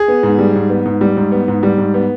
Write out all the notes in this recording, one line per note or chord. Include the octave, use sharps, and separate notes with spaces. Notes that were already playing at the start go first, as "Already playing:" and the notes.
Already playing: G#4
B3
G#2
G3
G#2
B3
G#2
G3
G#2
B3
G#2
G3
G#2
B3